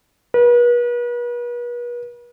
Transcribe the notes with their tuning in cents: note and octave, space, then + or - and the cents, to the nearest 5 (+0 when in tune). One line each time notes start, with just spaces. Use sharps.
B4 -40